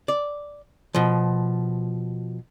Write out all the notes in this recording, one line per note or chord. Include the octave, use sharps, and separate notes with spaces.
D5
B2 F3